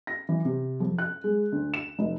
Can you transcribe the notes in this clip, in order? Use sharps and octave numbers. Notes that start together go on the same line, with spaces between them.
A#6
E3
C3
F2
F#6
G#3
D2
E7
F1